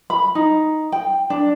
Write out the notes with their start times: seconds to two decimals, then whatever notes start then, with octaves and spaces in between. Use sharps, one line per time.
0.10 B5
0.35 D#4
0.92 G5
1.30 D4